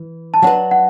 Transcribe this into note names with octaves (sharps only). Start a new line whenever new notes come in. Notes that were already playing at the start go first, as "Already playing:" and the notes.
Already playing: E3
A5
F#3 D4 B4 F#5
F#5